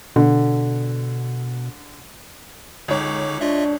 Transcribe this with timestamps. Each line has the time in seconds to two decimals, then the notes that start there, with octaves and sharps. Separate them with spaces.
0.16 B2 D3
2.88 C#2 D3 D#4 C#5 D6
3.41 D4 F4 D#5 E5